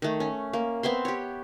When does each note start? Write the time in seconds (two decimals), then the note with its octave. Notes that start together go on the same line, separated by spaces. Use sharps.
0.02 D#3 A3
0.20 C#4
0.53 A#3
0.83 B3 C4 E5 C6
1.05 G4 C#5